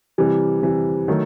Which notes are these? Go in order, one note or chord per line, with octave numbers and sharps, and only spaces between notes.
C3 E3 G3
C3 E3 G3
D#3 F#3 A3